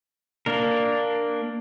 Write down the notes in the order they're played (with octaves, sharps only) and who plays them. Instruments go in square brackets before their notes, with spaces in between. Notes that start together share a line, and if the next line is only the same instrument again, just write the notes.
[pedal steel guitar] A#3 D4 A#4